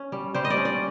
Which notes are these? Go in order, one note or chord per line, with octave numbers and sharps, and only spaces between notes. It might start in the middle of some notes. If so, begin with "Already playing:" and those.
Already playing: C#4
G3
G3 C5
D#5
D5
C#4
D5